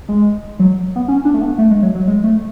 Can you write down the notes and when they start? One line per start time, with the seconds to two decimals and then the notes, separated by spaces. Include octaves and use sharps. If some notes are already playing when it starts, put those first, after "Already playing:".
0.09 G#3
0.59 F#3
0.96 B3
1.08 C#4
1.25 D4
1.34 A3
1.42 B3
1.58 A3
1.71 G#3
1.82 F#3
1.95 F#3
2.08 G#3
2.24 A3